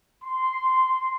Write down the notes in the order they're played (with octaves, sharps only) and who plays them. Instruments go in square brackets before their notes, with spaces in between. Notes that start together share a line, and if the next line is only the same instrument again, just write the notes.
[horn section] C6